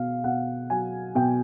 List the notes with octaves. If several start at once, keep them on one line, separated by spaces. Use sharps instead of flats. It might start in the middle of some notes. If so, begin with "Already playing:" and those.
Already playing: B2 F5
B2 F#5
F#3 G#5
B2 G5